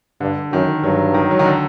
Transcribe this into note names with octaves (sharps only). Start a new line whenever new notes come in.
G2 D3
F#2 D#3
G2 F#3
D#3
F#3
D#3
D3